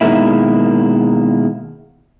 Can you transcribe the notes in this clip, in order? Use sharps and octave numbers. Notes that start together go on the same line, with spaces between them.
B2 D#3 F3 G#3 A#3 E4